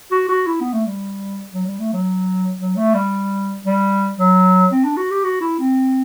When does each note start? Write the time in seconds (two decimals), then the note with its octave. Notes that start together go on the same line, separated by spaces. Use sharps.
0.11 F#4
0.29 F#4
0.47 E4
0.60 B3
0.73 A3
0.86 G3
1.53 F#3
1.66 G3
1.80 A3
1.93 F#3
2.59 F#3
2.76 A3
2.94 G3
3.65 G3
4.18 F#3
4.71 C4
4.84 D4
4.97 F#4
5.11 G4
5.24 F#4
5.41 E4
5.59 C4